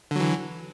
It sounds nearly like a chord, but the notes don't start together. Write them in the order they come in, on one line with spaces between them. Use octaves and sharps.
D3 F#3 E3